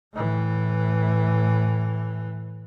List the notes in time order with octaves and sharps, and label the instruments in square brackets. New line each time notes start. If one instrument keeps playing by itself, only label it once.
[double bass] A2 E3